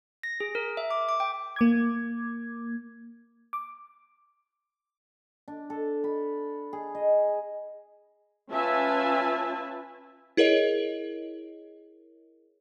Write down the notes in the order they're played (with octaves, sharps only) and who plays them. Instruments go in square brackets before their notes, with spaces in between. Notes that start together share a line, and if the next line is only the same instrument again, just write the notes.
[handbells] A#6
G#4
A#4
E5
D6
D6
G5
[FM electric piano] A#3 D6 G#6
D6
[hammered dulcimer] D4
A4
B5
G#4
D#5
[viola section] C#4 F4 B4 E5 G#5 A5
[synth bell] E4 G#4 A#4 C#5 D#5